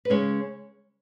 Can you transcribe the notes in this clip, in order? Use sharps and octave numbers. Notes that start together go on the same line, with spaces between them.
B4
C#3 G#3 C#4 C#5